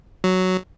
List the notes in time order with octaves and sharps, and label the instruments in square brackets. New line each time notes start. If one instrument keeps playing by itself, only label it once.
[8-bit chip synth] F#3